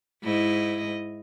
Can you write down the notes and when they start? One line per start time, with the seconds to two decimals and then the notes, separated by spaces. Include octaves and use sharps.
0.23 G#2 E4 D#5